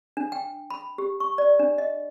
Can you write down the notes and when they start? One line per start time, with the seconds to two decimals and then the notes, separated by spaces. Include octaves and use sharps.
0.17 D4
0.32 G5
0.70 B5
0.98 G4
1.20 C#6
1.38 D5
1.59 D4
1.78 D#5